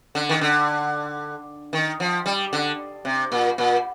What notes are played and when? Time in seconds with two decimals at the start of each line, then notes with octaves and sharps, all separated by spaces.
0.15 D3
0.29 D#3
0.41 D3
1.73 D#3
2.00 F3
2.26 G3
2.53 D3
3.05 C3
3.32 A#2
3.58 A#2